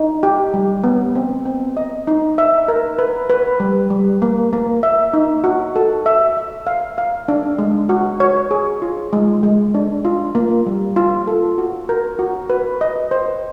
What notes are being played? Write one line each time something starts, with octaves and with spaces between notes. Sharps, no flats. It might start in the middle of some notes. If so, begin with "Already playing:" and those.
Already playing: D#4
G4
G3
B3
C4
C4
D#5
D#4
E5
A#4
B4
B4
G3
G3
A#3
A#3
E5
D#4
F#4
A4
E5
E5
F5
F5
D4
G#3
F#4
C#5
G#4
F4
G#3
G#3
D4
F4
A#3
G3
F4
A4
F#4
A#4
F#4
B4
D#5
C5